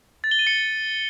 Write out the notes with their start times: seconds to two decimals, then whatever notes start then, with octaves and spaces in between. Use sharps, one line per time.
0.24 A6
0.31 G7
0.39 D#7
0.47 C#7